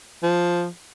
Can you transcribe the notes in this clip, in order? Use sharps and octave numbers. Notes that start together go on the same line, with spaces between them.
F3